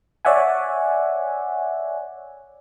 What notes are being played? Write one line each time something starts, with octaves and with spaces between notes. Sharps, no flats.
C#5 D5 E5 F#5 G#5